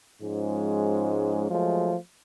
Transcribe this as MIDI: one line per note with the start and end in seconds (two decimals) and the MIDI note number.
0.21 1.47 44
0.21 1.47 53
0.21 1.47 56
0.21 1.47 61
1.49 1.95 53
1.49 1.95 54
1.49 1.95 56
1.49 1.95 57